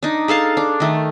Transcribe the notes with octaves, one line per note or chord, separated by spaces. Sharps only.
D4 D#4
G#4 A4 F5 A5
D4
D#3 A3